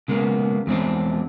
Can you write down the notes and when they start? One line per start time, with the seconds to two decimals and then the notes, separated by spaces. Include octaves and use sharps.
0.08 C#3 G#3 A#3 B3
0.67 E2 G#3 C4 D4